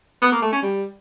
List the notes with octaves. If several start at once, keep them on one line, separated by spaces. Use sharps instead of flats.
B3
A#3
A3
C#4
G3